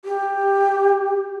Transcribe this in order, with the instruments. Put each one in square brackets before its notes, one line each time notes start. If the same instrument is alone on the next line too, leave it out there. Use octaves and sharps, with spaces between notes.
[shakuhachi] G4